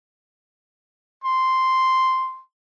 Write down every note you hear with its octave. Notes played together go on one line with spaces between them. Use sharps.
C6